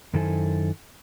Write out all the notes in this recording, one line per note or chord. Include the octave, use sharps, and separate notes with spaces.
F#2 D#3 E4 A4 C5 G#5